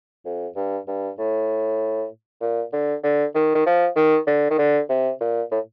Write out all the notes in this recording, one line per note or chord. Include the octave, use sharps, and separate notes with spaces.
F2
G2
G2
A2
A#2
D3
D3
D#3
D#3
F3
D#3
D3
D#3
D3
C3
A#2
A2